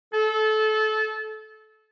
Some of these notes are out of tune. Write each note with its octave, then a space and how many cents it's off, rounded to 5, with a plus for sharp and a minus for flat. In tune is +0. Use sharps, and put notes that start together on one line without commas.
A4 -25